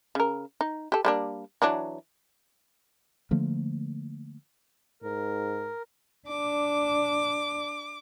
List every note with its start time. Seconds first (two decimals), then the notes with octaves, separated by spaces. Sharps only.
0.15 C#3 A#4
0.61 D#4
0.92 G4 A4
1.05 G3 A#3 D4
1.62 E3 F#3 D4
3.31 D3 F3 A3 A#3
5.03 G#2 A#4
6.28 D4 D6